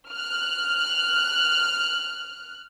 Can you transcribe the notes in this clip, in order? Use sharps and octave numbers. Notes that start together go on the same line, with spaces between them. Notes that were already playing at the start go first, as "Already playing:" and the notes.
F6 F#6